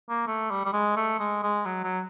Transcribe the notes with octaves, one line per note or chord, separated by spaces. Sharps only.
A#3
A3
G3
G3
G#3
A3
G#3
G#3
F#3
F#3